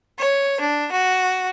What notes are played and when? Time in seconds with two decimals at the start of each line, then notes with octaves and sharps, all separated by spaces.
0.19 C#5
0.60 D4
0.91 F#4